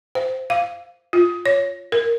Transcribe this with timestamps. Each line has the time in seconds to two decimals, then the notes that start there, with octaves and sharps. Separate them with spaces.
0.15 C5
0.50 F5
1.13 F4
1.46 C#5
1.92 A#4